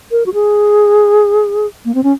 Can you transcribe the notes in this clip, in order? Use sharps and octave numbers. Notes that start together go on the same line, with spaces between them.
A#4
F#4
G#4
A#3
C4
C#4